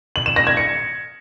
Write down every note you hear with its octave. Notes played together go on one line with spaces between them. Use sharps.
F#7
E7
A#6
G#6
C#7